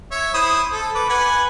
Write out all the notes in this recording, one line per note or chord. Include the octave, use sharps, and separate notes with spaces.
C#5 E5
E4 C5 D#6
A4
B4 D6
B4 F#5 G#5